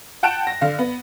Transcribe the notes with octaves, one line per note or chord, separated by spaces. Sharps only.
F#5 G5 A5 F#6 D7 E7
A#6
D3 F5
B3